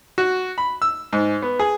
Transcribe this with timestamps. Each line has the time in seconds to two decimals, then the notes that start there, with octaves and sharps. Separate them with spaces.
0.18 F#4
0.58 B5
0.82 E6
1.13 G#2
1.42 B3
1.59 G#4